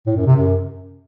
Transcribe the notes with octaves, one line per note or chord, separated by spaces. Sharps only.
A2
F#2
C3
F#2